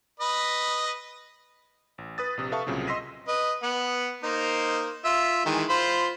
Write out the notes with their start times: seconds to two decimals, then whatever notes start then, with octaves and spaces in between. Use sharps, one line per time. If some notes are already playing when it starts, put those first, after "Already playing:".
0.20 B4 D#5 B5
1.98 A1
2.18 B4 D#6 A6
2.37 A#1 C3
2.52 A4 B4 E5 F5 A5 C#6
2.67 C2 A#2 C#3 F#3 C4
2.87 D#5 C6 E6 A#6 B6 D#7
3.28 B4 D#5
3.63 B3 F#5
4.23 A#3 D#4 C5
5.05 F4 E5
5.46 D#3 E3 G#3
5.69 F4 C5 B5